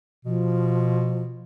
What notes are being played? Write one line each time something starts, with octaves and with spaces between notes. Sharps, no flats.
B2 F3